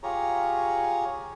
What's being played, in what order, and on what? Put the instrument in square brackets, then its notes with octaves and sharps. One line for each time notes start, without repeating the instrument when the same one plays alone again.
[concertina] F4 G4 G#4 C#5 A#5